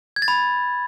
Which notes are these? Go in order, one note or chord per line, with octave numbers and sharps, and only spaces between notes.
G#6
A6
B5